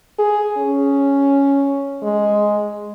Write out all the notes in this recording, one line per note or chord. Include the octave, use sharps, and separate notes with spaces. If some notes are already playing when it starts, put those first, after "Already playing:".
G#4
C#4
G#3